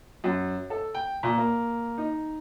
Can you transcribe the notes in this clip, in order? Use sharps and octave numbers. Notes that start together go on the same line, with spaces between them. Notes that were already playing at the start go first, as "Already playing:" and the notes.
F#2
A4
G5
A#2
A#3
D#4